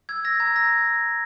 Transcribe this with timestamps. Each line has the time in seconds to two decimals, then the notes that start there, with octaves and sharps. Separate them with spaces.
0.09 E6 G#6
0.24 E6 A#6
0.40 A#5 G#6
0.56 E6 A#6